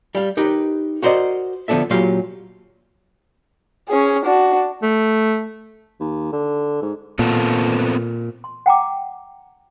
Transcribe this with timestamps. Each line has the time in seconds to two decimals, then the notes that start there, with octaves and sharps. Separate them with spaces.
0.15 G3 F5
0.37 D#4 G4 A#4 B4
1.02 F#4 A#4 C5 D5 D#5
1.68 D3 F3 B3 D4 A4 E5
1.90 A#2 F#3 G4 F5 C6
3.89 C#4 G#4
4.25 D4 F#4
4.83 A3
6.00 D#2
6.32 D3
6.82 G#2
7.19 A#2 B3 C4 A4
8.44 C6
8.66 F#5 G5 A#5 D6